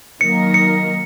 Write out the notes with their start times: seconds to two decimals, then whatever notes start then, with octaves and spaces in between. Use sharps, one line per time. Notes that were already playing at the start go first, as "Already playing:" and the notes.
0.21 D#3 F#3 A#3 D#4 A#4 C#7
0.54 C#7